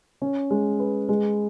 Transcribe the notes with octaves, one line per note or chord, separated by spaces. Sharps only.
C#4
G#3
B4
G#3